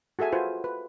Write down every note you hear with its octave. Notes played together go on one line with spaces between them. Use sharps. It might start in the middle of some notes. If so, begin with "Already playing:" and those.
F#4 G#4 A4 E5 G#5
F4 F#4 B4 C5 G#5
B4